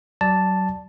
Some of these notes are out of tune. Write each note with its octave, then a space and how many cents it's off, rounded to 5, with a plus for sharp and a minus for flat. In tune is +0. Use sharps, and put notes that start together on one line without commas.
F#3 +30 D5 -5 A5 +0